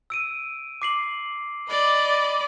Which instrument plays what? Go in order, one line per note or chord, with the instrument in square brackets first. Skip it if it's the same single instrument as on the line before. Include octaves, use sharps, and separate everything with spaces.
[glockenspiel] E6 D7 D#7
D6 C7 F#7
[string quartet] D5 D#5 B5